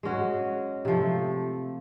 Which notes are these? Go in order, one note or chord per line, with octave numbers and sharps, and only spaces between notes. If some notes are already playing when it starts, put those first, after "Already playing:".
G#3 C#4 F#4
C3 F3 A3